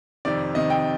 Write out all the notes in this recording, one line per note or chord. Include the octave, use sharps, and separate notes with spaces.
F2 C3 D#3 D5
F2 C3 D#3 D#5
G5